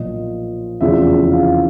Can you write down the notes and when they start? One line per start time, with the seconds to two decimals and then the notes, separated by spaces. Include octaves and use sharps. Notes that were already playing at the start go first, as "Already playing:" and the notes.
Already playing: B1 A#2 F3 D#5
0.81 F1 E2 C#3 F3 E5
1.31 F5